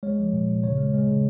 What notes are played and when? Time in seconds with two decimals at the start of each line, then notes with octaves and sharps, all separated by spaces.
0.03 G#3 C#5
0.19 F3
0.33 A#2
0.48 A#2
0.63 C#3 C#5
0.78 G#3
0.94 G#3
1.08 C#3